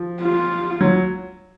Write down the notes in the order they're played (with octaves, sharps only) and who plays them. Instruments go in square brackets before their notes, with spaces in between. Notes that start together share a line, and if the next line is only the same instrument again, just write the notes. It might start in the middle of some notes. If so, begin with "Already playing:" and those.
Already playing: [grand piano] F3
[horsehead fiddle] F4
[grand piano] F#3